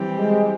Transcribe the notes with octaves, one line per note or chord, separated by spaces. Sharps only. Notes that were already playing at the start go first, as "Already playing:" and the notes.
Already playing: E3 G3 C4 G4 C5
G#3